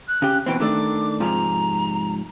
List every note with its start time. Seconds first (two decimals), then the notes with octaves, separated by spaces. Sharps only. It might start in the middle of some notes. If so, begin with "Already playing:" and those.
0.08 F#6
0.22 C#3 G4
0.46 B2 E3 C4 G5
0.60 D#3 A3 D4 D6
1.20 G#2 C3 F3 A#5